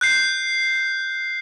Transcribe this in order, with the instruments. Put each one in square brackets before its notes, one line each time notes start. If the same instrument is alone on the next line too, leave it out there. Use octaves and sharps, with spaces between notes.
[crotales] F#6 G6 C7